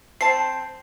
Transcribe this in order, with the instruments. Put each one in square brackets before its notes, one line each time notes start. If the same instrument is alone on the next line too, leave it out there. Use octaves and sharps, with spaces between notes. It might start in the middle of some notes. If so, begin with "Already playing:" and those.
[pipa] C4 A5 [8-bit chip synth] C7